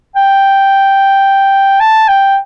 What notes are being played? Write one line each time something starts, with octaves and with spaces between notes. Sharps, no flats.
G5
A5
G5